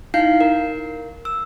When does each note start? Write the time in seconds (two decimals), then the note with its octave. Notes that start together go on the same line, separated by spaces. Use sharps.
0.14 D#4 E4 F5 G6 C7
0.41 A#4
1.25 E6